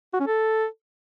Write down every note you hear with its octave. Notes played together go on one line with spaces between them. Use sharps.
F#4
C#4
A4